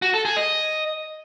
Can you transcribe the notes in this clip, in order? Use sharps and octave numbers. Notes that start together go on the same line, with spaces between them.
F#4
A4
G#4
D#5